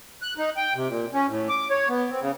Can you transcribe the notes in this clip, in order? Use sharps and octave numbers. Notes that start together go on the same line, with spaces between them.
F#6
D#4
G5
C3
A#2
C#4
A2
D6
C#5
B3
C4
C#3